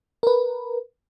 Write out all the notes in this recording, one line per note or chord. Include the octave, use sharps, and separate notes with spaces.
A#4 B4